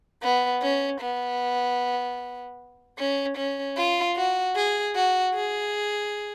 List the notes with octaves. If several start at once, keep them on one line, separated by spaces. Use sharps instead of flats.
B3
C#4
B3
C#4
C#4
F4
F#4
G#4
F#4
G#4